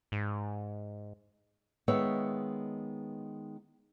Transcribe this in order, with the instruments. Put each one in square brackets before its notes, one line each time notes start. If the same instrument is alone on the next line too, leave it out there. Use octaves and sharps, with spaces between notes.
[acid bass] G#2
[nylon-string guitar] D#3 G#3 B3 B4 C#5 E5